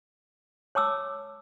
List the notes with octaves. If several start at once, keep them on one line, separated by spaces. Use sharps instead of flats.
C#5 A5 D6 E6